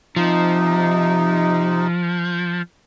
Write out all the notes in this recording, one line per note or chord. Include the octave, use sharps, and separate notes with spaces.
C3 F3 D#4